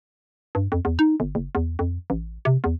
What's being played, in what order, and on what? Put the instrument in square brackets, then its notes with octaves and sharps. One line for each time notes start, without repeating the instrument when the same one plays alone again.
[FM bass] G2
F2
E2
D#4
G1
F#1
E2
F2
A1
C3
E2